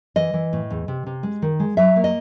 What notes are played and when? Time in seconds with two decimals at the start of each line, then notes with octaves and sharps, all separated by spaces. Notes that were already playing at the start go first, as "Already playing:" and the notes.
0.16 E3 D#5
0.34 E3
0.53 A2
0.70 E2
0.88 C3
1.06 C3
1.23 G#3
1.42 D#3
1.60 G#3
1.77 F#3 E5
1.96 A#3
2.04 D#5